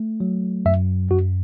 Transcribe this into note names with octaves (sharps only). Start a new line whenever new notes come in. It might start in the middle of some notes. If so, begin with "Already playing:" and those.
Already playing: A3
F#3
F#2 E5
F#2 F#4